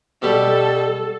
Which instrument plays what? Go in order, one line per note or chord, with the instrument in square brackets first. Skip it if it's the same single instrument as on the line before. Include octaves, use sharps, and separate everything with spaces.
[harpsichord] B2 G3 [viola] A4